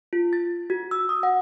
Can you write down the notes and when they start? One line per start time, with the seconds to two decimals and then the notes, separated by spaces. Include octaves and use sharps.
0.13 F4
0.33 A6
0.70 F#4
0.91 E6
1.09 D#6
1.23 F#5